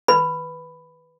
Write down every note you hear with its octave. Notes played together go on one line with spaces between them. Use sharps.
B4 B5